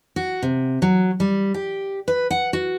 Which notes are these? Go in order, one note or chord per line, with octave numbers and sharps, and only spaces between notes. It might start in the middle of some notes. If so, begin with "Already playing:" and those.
F#4
C3
F#3
G3
G4
B4
F#5
F#4